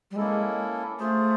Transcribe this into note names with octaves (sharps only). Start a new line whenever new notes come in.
G3
G#3 A#3 C#4 E4 A4
A3 F4 G#4 C5